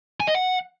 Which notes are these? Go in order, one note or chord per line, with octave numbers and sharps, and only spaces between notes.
G#5
D#5
F#5